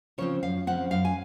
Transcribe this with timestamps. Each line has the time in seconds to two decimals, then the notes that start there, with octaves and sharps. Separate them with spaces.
0.18 C#3 F3 C4 C#5
0.43 F#2 F5
0.67 C#3 F3 C4 F#5
0.91 F#2 F5
1.05 G#5